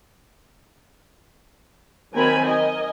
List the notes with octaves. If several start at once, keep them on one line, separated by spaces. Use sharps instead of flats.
D#3 F#3 C4 A#4 G#5 B5
A#4 D#5 G#5